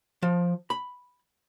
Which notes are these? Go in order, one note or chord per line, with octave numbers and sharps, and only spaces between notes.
F3
B5